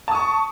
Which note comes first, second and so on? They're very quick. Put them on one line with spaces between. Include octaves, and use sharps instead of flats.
A5 D#6 C#6